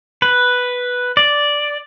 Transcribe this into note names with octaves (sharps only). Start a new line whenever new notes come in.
B4
D5